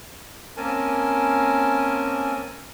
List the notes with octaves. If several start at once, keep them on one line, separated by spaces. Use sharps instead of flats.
A#3 C4 C#4 A#4 G#5 A5